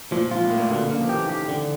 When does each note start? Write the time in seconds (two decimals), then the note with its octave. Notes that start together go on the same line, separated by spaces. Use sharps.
0.12 A#2 F3
0.31 G#2 F4
0.44 A2
0.51 A#3
0.58 A#2
0.70 B2 D3
0.81 C#3
0.90 D3 A#3
1.00 F3
1.09 E3 G4
1.23 D#3
1.30 G4
1.48 D3